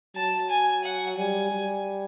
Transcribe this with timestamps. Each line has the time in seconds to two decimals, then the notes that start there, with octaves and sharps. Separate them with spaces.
0.15 F#3 A5
0.49 G#5
0.84 F#5
1.17 G3 G#5
1.51 G3